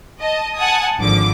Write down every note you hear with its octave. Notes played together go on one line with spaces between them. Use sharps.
D#5 A5
F#5 G#5 A5 D#6
G#1 D3 F3 D6